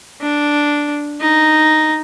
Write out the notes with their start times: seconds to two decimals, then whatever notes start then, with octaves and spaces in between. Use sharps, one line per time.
0.21 D4
1.21 D#4